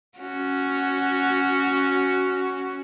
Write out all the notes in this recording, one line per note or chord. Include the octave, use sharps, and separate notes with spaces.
C#4 F#4